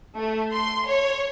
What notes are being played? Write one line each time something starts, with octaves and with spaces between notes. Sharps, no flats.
A3
C6
C#5